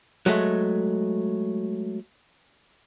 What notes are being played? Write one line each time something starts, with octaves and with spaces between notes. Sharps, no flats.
F#3 G#3 A3